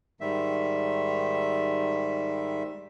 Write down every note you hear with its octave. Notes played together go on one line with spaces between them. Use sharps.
G#2 D#3 G3 E5